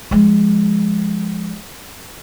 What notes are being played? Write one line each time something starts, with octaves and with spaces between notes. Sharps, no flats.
F3 G#3